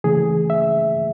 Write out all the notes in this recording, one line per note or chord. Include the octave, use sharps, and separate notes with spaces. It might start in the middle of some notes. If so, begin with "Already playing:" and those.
C#3 E3 A3 G#4
E5